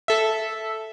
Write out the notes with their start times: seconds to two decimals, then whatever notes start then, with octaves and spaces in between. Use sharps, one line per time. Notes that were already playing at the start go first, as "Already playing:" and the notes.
0.08 A4 E5